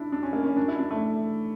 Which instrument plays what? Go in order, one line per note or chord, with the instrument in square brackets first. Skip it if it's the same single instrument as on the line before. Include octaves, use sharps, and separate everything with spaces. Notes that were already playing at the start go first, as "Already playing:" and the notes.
Already playing: [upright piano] D4 E4
D4
C#4
A#3
C#4
D4
E4
D4
A3